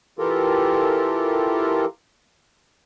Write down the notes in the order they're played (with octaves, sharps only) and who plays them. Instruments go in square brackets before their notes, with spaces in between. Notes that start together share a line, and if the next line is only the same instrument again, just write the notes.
[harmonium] E3 F4 G4 A4 A#4